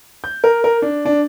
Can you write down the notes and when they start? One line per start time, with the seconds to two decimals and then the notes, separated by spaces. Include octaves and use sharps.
0.24 G6
0.44 A#4
0.64 A#4
0.82 D4
1.05 D4